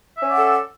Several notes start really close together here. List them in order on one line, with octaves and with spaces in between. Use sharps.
E5 C#4 D5 F#5 A4